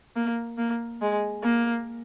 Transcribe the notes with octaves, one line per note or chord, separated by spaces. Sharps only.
A#3
A#3
G#3
A#3